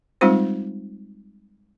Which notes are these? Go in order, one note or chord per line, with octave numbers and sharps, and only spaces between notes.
G3 G#3 C4 D#4 F4 C5